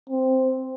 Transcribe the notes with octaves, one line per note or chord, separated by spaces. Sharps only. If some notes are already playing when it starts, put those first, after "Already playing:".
C4